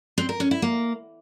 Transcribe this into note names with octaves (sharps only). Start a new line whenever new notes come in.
C4
A#4
C#4
E4
A#3